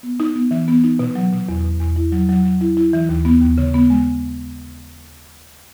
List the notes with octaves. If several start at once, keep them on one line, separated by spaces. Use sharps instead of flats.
B3
D#4
B3
E3
B3
D#4
B2
F#3
B2
E2
B2
E2
E4
F#3
F#3
F#3
E4
E4
E3
D#2
B3
D#2
C#3
B3
G#3